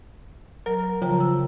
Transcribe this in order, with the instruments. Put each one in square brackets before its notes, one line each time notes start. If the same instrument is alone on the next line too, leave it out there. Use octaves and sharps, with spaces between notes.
[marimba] F#3 [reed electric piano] A#4
[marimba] C#3 G5 A#5 [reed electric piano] F3
[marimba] E6